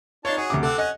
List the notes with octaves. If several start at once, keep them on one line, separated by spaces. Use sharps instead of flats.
D4 D#4 F4 C#5 A5
F#4 G#4 C#5
D2 C3 D6
C4 A4 F#5 D6
C#4 D#5 F#5